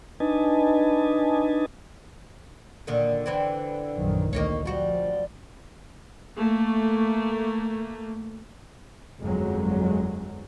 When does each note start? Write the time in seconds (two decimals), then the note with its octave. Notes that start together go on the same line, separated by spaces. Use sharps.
0.20 D4 D#4 B4 D#5 G#5 A5
2.87 A#2 D3 D#3
3.26 D3 E3 C4
3.95 A#1 F#2 D#3
4.33 D2 D#3 A#3 D#4 C#5
4.65 F3 G3 F#4
6.37 A3 A#3
9.22 G1 F2 F#3 G#3